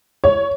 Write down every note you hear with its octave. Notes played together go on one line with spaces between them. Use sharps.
C#5